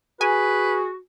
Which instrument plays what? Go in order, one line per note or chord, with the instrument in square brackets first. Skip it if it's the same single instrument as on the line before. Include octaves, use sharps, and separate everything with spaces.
[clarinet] F#4 [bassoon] G#4 [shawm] B4 [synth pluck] G#5